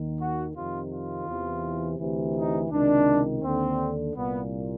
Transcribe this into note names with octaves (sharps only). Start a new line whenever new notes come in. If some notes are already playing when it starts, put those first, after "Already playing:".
Already playing: D#2 D#3
F#4
F2 C3 D#3 F4
F4
E2 C3 E3
D2 C3 E3
D#4
C#2 C3 D#3 D4
D#2 D3 C4
C2 A#2 B3